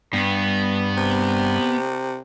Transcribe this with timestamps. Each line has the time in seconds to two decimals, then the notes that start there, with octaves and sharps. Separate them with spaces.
0.13 G2 B3
0.97 C3